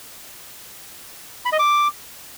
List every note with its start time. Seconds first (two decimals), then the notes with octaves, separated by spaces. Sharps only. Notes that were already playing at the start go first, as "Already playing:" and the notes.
1.45 B5
1.52 D#5
1.59 D6